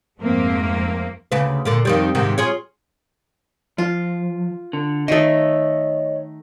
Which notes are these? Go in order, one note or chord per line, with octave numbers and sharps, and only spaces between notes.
F2 G#2 A3 A#3 C4
D2 C#3 B4
A#2 D3 A#3
F2 D#3 G3
G#2 C3 D#3
F4 G#4 C#5
F3 F4
D3
D#3 A3 C#5 D#5